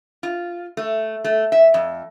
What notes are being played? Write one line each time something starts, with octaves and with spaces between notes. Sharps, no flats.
F4
A3
A3
E5
F2